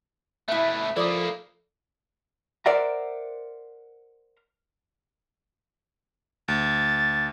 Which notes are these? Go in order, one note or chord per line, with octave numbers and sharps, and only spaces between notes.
B2 A3 E4 B4 E5
F3 A#3 E4 A4 D5 D6 D#6
A#4 C5 D5 E5 F#5 A#5
D2 A6